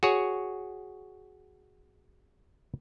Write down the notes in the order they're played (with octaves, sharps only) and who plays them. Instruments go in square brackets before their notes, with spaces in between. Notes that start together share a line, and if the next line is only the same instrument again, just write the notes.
[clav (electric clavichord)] F#4 G#4 C#5